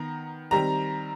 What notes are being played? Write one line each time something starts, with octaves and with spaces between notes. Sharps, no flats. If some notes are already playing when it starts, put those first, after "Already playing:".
Already playing: D#3 B3 A#5
D#3 G3 C4 A#5